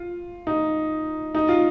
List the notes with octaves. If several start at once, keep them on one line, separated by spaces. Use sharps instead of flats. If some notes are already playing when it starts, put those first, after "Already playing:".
Already playing: F4
D#4
D#4
F4